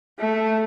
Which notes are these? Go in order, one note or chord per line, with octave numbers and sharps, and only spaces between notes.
A3